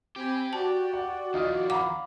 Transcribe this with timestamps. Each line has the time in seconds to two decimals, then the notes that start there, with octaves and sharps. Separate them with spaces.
0.16 C4 G4 G#5 B5
0.53 F#4 D5 A5
0.93 F#5
1.34 D#3 F3 D#4 F4 D#6
1.70 F5 F#5 A#5 B5 D6